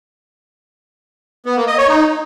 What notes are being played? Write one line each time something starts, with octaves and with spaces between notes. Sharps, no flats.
B3
A#3
D#5
C#5
D#4